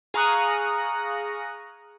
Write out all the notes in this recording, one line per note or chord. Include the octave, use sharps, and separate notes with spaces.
G#4 F5 A#5 C#6 D#6 F#6